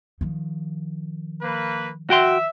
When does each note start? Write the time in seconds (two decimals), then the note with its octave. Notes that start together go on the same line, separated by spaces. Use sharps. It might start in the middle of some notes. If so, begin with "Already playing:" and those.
0.21 D#3 F3
1.42 A#3 B4
2.10 F#4 E5 G5 C6